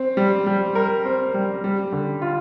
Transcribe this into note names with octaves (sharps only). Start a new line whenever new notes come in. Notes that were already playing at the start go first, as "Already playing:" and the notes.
Already playing: C4
G3
G3
A#4
C4
G3
G3
D3
F4